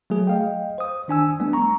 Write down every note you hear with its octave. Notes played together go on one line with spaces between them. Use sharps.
F#3 A3 G#4
D#5 F5 G5
C5 D#6
D#3 D4 G#5 E6
G3 A3 B3 D4
A#5 C#6